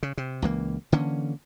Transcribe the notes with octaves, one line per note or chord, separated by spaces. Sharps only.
C#3
C3
C#2 E3 A#3
D3 E3 A#3 C#4